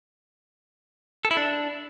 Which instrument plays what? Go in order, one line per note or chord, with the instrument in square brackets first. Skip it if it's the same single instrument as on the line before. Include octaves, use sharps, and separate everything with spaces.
[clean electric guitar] A4
E4
D4